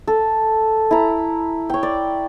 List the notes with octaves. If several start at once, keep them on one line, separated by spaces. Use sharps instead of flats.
A4
E4 A#5
C#5 G5
D5